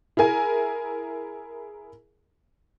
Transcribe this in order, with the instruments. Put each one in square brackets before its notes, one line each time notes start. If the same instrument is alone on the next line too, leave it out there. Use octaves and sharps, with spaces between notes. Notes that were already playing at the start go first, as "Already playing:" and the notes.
[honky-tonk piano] E4 G#4 A#4 G#5